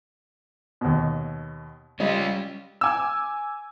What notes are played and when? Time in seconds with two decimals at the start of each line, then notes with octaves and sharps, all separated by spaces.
0.81 D#2 B2
2.00 G3 C#4 F4 D#5
2.81 G#5 D6 E6